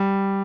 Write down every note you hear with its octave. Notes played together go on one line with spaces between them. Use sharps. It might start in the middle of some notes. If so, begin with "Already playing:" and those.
Already playing: G3